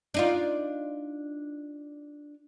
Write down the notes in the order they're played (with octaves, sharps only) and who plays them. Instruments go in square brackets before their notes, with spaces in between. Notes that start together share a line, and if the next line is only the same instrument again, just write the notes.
[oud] D4 D#4 F4